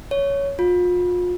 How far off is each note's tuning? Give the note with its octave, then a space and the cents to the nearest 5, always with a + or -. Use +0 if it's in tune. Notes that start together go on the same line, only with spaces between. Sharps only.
C#5 +10
F4 +35